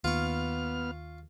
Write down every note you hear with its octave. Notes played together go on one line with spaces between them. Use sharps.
D#2 B3 F4 C#6 F6